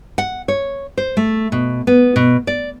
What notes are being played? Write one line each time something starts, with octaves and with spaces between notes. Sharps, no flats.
F#5
C#5
C5
A3
B2
B3
B2
D5